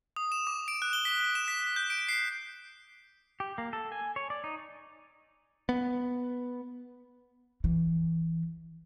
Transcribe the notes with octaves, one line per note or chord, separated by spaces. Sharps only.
D#6
E7
D6
D7
F#6
G7
B6
E7
B6
G6
D7
C7
G4
A#3
A4
G#5
C#5
D5
D#4
B3
E3